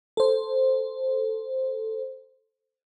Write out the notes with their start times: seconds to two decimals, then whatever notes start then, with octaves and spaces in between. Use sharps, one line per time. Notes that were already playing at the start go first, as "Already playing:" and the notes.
0.17 A4 C5